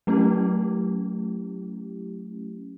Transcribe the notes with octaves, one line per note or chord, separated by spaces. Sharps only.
F#3 A3 C#4 E4 G4